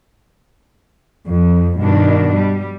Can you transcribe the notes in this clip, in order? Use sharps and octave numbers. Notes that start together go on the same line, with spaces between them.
F2
G2 B2 D#3 D4
G3